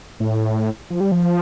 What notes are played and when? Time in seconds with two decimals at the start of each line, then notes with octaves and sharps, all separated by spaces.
0.20 A2
0.90 F3
1.00 G3
1.12 F3